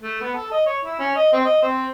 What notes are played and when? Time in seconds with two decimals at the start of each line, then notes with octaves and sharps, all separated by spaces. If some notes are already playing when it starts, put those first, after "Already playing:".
0.03 A3
0.21 B3
0.35 A4
0.51 D#5
0.66 C#5
0.85 E4
0.99 C#4
1.16 D#5
1.33 C4
1.45 D#5
1.62 C4